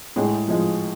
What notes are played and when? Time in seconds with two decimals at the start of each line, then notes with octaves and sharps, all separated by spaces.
0.16 A2 G#3 G#4
0.48 F3 G#3